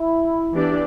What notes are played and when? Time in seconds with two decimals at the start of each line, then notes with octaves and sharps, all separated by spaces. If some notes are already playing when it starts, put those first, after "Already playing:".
Already playing: E4
0.53 E3 B3 D4 G4 D5